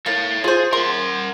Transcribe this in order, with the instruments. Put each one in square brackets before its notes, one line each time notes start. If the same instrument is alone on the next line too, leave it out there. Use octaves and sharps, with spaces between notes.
[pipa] A#3 [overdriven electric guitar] A4 C#5
[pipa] F4 C5 [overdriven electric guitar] G#4
[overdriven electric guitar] A#4 F#5 [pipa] C6